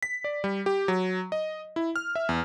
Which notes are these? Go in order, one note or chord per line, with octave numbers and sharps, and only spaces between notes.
B6
D5
G3
G4
F#3
D#5
E4
F6
E5
E2